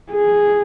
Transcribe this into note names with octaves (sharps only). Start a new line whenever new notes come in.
G#4